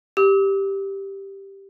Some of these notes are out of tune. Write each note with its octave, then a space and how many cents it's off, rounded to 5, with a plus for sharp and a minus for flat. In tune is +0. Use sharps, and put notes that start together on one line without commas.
G4 +0 E6 -40